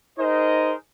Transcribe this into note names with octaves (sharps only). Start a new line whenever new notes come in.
D#4 G#4 A#4 C5 D#5